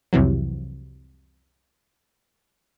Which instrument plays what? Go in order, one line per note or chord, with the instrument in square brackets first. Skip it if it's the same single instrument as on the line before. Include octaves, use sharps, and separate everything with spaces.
[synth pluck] C2 F2 C3 E3 F#3